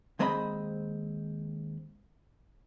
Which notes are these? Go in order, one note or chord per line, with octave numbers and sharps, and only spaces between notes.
D#2 G#3 C4 D#5 G#5 B5